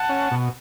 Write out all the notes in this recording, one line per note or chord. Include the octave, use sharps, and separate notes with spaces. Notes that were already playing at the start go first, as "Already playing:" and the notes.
Already playing: F#5 A5
C#4
B2